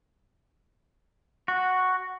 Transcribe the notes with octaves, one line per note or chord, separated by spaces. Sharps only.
F#4